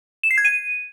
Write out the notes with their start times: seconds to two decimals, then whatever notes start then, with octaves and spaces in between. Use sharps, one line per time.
0.23 E7
0.31 C7
0.38 G#6
0.45 D#7